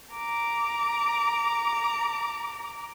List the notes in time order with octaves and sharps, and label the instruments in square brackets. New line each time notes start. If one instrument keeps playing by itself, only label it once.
[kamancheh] A#5 D6